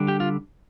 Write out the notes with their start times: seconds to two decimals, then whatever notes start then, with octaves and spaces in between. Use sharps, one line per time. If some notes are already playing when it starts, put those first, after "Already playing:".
Already playing: D3 G3 D4
0.08 G4
0.20 F4